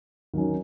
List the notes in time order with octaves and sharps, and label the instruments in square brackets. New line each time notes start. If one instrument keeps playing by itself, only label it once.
[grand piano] D#3 F#3 C#4